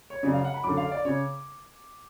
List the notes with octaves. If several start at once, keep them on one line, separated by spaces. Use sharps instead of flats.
C#5
F#2 C#3 D5
F5
F#5
B5
F#2 D3 D6
F5
D5
C#3 C#5